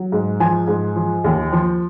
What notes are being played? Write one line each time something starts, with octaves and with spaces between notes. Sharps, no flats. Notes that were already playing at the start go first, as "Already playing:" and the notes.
Already playing: F#3
G#2
F3 G#5
G#2
F3
D#2
F3